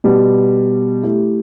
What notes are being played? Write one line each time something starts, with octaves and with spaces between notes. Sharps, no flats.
B2 G3 B3
A3 E4 G4